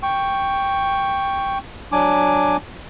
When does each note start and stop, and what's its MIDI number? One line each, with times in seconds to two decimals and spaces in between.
0.03 1.58 79
0.03 1.58 85
1.92 2.57 54
1.92 2.57 62
1.92 2.57 80
1.92 2.57 86